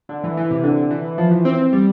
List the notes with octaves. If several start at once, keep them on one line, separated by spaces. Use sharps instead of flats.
D3
E3
E3
C3
D3
D3
E3
E3
F3
E3
C4
G3